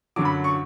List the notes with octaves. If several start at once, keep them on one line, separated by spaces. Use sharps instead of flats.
F#2 D3 F#3 D6
B5
C#6